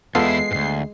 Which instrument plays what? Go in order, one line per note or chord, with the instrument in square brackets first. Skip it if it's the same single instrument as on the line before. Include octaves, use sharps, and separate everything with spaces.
[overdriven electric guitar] E2 E4 [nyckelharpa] G#3 [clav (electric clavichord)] B3 F4 A4 [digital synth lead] C7
[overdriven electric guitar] D2 G#2